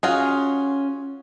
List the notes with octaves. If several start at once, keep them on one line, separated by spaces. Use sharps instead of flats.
C#4 F4 F#4 G#4